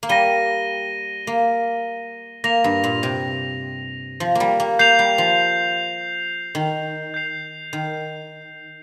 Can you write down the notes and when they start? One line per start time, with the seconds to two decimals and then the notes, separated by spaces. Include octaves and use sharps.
0.03 A#3
0.09 G3 A#6 D#7 G7
1.27 A#3
2.44 A#3 A#6 F7
2.64 G2
2.84 A#2
3.03 C3
4.20 F3
4.35 G3 A#3
4.60 A#3
4.79 A#3 G6 C7 F7
4.99 G3
5.18 F3
6.55 D#3
7.14 G6 C7 F7
7.73 D#3